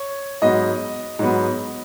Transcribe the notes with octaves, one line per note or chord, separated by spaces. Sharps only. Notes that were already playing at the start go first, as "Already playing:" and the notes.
Already playing: C#5
G#2 F#3 B3 D#5
G#2 F#3 B3